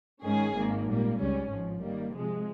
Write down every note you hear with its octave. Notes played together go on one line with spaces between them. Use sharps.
G#2 D#3 G#3 C#4 G#4
G#1 G#2 D#3 A#3
A#2 G3 A#3
C#2 C#3 G3 C#4
G#1 G#2 F3
D#3 G3 A#3
C3 F3 G#3